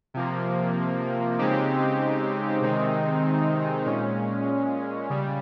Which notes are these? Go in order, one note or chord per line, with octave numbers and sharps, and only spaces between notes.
C3 F3 A#3
C#3 G#3 C4 D#4 G4
C3 D#3 G#3 C4 D#4
A#2 G#3 C#4
C#3 G3